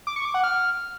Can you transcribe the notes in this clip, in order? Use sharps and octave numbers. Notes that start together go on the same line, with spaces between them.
D6
C#6
D6
F#5
F6